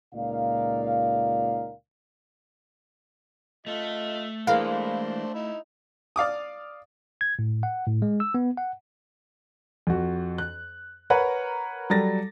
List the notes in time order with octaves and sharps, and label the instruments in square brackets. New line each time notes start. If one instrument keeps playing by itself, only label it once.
[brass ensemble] C#2 A#2 D#4 A#4 D5 F5
[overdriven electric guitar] A3 A4 [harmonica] F4 D#5
[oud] E3 G#3 A#3 [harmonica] D4 C5 [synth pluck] F5
[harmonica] D#4 E4
[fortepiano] D5 F5 D6 D#6
[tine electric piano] G#6
A2
F#5
A2
G#3
E6
B3
F#5
[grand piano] F2 F#4
F#6
A#4 B4 C#5 F#5 A#5
F#3 G3 A4 A6 A#6